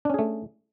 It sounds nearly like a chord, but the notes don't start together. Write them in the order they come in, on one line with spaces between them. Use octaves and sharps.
D4 C#4 G#4 A3